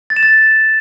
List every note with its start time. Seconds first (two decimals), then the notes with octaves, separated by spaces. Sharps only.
0.10 A6
0.16 E7
0.23 A6